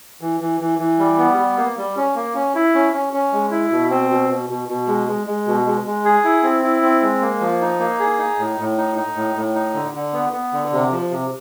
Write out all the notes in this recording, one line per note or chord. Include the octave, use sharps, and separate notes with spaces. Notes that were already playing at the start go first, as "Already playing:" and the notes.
E3
E3
E3
E3
G3
B3
G3
A#3
G3
C#4
A#3
C#4
E4
C#4
C#4
C#4
G#3
E4
B2
C4
B2
B2
B2
B2
G#3
G#3
G#3
B2
G#3
G#3
G#4
E4
C4
E4
C4
G#3
A#3
F3
D#4
A#3
G#4
D#4
A2
A2
D#4
D#4
A2
A2
D#4
D3
D3
B3
B3
D3
C3
F3
C3